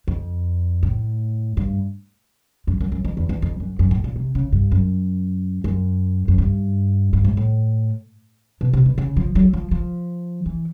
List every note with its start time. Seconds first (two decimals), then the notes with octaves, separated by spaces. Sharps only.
0.08 F2
0.83 A2
1.57 G2
2.67 F#2
2.81 F#2
2.92 F#2
3.05 F2
3.17 E2
3.29 E2
3.42 F2
3.60 F#2
3.79 F#2
3.91 A2
4.04 A#2
4.16 C3
4.35 C#3
4.52 G2
4.71 F#2
5.64 F#2
6.28 F#2
6.38 G2
7.13 G2
7.24 G#2
7.37 A2
8.61 B2
8.73 C3
8.86 B2
8.98 C#3
9.16 F3
9.35 F#3
9.53 F3
9.71 F3
10.46 E3